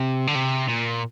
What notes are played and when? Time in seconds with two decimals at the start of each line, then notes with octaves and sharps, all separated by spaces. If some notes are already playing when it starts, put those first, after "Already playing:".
Already playing: C3
0.27 D3
0.35 C3
0.69 A#2